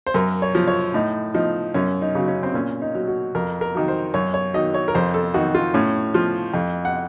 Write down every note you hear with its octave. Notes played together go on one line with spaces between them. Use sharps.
C5
F#2 A#4
C#5
F3
C#5
A2 D#4
F3 D#4
F#2 C#4
D#4
C#3 F#3
C#4
C4
A#2 C#4
D#4
F#3
F#4
F2 A#4
A#4
D#3 F#3
C5
F#2 C#5
C#5
D#3 F#3 D#5
C#5
A#4
F2 C5
A4
D#3 F#3 F#4
F4
A2 C#4
F3 F4
F2
F#5